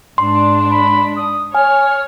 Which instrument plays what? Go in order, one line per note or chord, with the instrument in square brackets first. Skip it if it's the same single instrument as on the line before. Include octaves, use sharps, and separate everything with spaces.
[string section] G#2 D4 [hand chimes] C6
[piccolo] B5
D#6
[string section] C#5 [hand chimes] G#5 [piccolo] F6